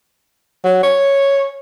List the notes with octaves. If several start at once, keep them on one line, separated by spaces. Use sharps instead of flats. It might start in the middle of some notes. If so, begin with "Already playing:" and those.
F#3
C#5